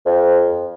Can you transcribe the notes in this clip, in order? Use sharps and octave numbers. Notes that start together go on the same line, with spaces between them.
F2